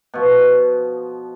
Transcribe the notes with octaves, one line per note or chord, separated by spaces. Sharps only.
B2 F3